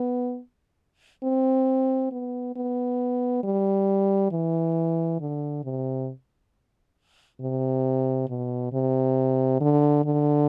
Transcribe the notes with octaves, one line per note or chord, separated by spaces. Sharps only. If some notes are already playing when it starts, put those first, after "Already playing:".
Already playing: B3
C4
B3
B3
G3
E3
D3
C3
C3
B2
C3
D3
D3